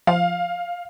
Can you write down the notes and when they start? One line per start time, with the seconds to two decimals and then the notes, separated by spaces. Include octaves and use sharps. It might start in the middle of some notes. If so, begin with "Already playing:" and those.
0.07 F3 F5